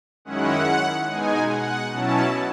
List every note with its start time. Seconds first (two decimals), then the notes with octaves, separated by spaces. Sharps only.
0.25 F#2 D#3 G#3 C#4 E4 F#5
1.08 B2 G#3 D#4 G#5
1.51 F#5
1.93 B2 F#3 C#4 E4 A5